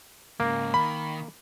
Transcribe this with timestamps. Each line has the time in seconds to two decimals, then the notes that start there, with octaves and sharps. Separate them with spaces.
0.40 G#2 C#3 A#3
0.74 D#3 B5